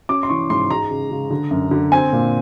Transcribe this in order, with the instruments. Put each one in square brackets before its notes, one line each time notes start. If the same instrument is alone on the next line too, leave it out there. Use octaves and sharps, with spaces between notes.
[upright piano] C#4 D6
C6
E3 C#6
G#2 C6
G#3 A#5
C#3
C#3
D3
F#2
D3
C4 G#5
A#2